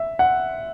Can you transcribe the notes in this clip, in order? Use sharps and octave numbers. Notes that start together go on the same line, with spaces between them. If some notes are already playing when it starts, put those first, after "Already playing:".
Already playing: E5
F#5